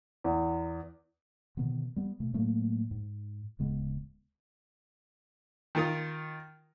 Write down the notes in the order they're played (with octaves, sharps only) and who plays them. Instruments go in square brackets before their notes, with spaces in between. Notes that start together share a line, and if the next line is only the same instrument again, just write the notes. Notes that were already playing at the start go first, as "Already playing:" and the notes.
[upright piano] E2
[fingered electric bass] B2 D3 D#3 B3
G3 B3
B2 A3
A2 F#3 A3 A#3
G#2
D1 C#3 G#3 B3
[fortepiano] D#3 F4 A#4 D#6